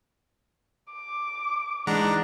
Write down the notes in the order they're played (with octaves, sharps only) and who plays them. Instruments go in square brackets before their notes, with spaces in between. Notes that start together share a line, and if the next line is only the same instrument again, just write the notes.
[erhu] D6
[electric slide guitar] E3 D#4 [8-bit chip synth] G#3 F#5 A#5 [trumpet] D4